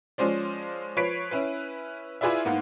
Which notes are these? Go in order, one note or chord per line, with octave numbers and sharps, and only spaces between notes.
F3 G#3 C#4 C5 D5
F3 B4 C#5 B6 C7 D7
C#4 E4 B4
E4 F4 G#4 B4 D5 E5
G#2 A#3 B3